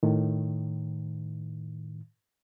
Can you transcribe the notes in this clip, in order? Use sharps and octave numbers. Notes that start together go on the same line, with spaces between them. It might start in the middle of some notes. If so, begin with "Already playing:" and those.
A2 D#3